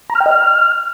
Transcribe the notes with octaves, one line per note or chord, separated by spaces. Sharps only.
A#5
F6
G5
D#5
F6